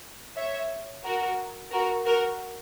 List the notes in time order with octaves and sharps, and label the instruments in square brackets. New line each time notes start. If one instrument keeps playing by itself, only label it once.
[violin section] C#5 E5
F#4 A#4
F#4 A#4
F#4 A#4